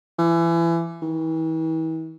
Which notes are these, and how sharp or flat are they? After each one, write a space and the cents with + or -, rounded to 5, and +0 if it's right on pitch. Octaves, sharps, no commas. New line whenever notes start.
E3 +30
E3 -40